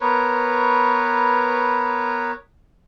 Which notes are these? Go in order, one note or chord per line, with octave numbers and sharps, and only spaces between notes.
B3 A#4 B4 C#5